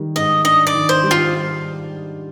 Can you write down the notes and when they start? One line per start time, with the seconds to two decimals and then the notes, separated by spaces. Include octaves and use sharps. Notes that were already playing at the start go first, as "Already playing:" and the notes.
Already playing: D#3 G3
0.16 G#2 D#5
0.45 D4 D#5
0.67 D5
0.75 D#3
0.89 C5
1.03 G3
1.11 F4